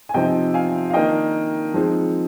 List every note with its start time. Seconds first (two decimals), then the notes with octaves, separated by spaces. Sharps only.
0.09 G#5
0.14 C3 F3 C4 D#4 D#5 G5
0.54 F5 G#5
0.90 F5
0.93 D#3 A#3 D4 D#5 G5
1.74 F3 G#3 C4 D#4